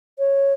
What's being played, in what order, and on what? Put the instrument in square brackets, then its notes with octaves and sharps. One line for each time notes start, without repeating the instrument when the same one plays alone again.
[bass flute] C#5